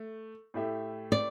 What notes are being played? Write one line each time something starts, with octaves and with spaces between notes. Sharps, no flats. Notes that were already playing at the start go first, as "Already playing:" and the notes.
Already playing: A3
A2 A3 G4 E5
D5